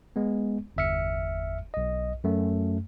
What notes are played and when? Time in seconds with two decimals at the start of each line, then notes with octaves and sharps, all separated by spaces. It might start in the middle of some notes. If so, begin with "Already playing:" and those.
0.16 G#3 B3
0.76 G1 E2 E5 F6 C#7
1.74 B1 D#5
2.24 F#2 A3